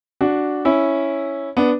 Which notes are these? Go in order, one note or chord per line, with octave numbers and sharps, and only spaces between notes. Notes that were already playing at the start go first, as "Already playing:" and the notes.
D4 F#4
C#4 E4
B3 D4